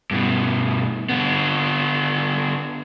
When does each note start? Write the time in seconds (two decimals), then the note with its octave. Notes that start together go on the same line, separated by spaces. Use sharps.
0.11 G2 B2
1.10 D3 B3